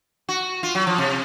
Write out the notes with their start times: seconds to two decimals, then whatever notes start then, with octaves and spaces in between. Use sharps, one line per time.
0.29 F#4
0.63 F4
0.75 F#3
0.87 F3
0.98 C3